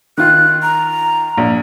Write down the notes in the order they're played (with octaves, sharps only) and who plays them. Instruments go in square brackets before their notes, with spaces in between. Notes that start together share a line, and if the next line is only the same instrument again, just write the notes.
[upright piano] D#3 F4 [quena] F#6
[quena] A#5
[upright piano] A#1